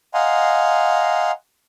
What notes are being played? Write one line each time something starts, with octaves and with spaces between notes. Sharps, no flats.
D#5 F5 F#5 G#5 A#5 C6